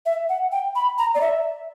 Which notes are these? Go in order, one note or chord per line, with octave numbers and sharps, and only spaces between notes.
E5
F#5
G5
B5
A#5
D5
E5